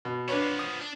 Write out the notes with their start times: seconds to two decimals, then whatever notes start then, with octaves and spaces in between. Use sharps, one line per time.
0.05 B2
0.29 F3 B3 D4 B4 C#5
0.59 D#6
0.81 D4